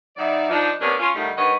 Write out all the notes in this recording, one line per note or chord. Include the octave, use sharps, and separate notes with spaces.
D#3 F#3 D#4 E4 D5
F3 D4 D#4
C3 A#3 B3 C#4 D4
C#4 F4
A2 D3 D#3 G3 A3 D#4
G2 D#3 B4 C#5 D#5 F#5